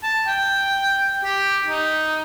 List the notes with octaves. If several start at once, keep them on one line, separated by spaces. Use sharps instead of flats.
A5
G5
G4
D#4